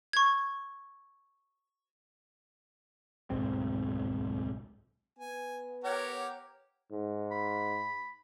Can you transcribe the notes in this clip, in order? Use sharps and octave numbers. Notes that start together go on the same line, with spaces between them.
C#6 G#6
D1 B1 G#2 C4
B3 G#5
G4 A#4 C#5 F#5
G#2
B5